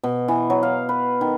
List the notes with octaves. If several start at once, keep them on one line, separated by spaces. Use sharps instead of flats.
B2
E3
F#3
F5
B4
D#3